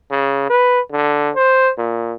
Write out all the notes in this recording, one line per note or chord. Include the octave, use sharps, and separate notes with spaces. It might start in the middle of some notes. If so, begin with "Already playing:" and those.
C#3
B4
D3
C5
A#2